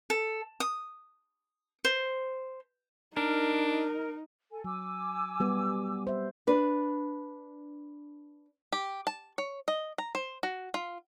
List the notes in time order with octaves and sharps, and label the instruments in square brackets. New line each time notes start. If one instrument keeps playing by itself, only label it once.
[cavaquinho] A4
D#6
C5
[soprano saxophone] D4 [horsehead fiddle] D#4 [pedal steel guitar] A#4
[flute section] A4 G#5
[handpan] F#3 [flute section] G#5 D6 E6
[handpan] G3 B3 G4
C5 E5
[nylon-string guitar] D4 B4
[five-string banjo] G4
A5
C#5
D#5
A#5
C5
F#4
F4